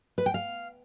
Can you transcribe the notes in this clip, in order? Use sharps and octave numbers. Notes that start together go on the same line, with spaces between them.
B4
G5
F5